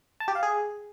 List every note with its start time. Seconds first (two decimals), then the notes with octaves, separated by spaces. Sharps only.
0.20 A5
0.28 G4
0.35 F5
0.43 G#4